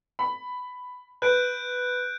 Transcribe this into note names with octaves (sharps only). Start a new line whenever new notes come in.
B5
B4 F#6 G6 D7